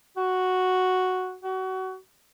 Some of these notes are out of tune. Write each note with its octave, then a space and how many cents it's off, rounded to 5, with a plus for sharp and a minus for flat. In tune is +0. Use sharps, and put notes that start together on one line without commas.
F#4 +0
F#4 +25